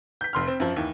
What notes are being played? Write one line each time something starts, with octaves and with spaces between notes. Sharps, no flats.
G6 B6
F1 C6 F6
C4
F#2 F3
D#2 E3